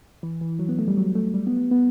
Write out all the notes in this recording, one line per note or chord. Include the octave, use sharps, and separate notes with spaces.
E3
E3
F#3
B3
A3
G3
F#3
A3
G3
B3
B3